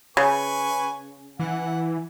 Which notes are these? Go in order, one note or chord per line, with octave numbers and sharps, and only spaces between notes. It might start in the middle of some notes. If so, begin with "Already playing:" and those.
C#3 B4 G#5 C#6
E3 F#5